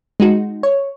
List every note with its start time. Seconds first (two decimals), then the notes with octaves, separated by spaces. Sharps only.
0.20 G#3 D#4 F#4
0.63 C#5